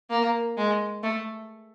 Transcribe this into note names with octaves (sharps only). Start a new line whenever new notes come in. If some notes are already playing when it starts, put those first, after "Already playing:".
A#3
G#3
A3